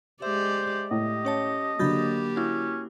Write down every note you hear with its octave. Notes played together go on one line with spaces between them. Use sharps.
G#3 G4 C5 D5 E5
A2 G4 D#5
C#4 C#5 A5
D3 F#3 A#3 G4 B5 G6 A6
C#4 E4 F#4